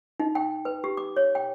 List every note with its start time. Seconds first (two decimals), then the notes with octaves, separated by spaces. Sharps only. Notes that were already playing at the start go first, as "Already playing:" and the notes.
0.20 D#4
0.35 G5
0.65 B4
0.84 G4
0.97 D6
1.17 C#5
1.35 G5